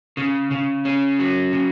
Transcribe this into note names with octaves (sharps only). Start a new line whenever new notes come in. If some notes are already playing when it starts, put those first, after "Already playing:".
C#3
C#3
C#4
F#3
C#3